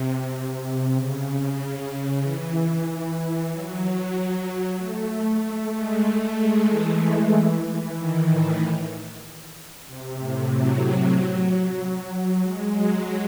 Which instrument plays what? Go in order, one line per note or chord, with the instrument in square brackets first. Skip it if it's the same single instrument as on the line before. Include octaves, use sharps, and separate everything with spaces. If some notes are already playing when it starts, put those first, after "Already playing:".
Already playing: [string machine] C3
C#3
E3
F#3
F#3
F#3
A3
A3
G#3
A3
G#3
E3
D#3
A2
C3
A2
F#3
G#3
F#3